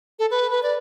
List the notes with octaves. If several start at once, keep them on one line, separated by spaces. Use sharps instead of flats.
A4
B4
B4
D5